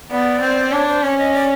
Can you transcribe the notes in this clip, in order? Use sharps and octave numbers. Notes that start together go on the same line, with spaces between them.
B3 D5
C4
D4 C#5
C5
C#4 C#5
D#5
D5